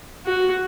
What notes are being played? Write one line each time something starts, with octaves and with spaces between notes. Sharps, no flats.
F#4